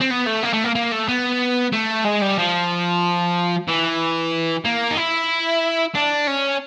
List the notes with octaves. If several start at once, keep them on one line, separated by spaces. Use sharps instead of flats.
C4
B3
A3
A#3
A3
A#3
A#3
A3
B3
A3
G#3
G3
F3
E3
A#3
D#4
E4
D4
C#4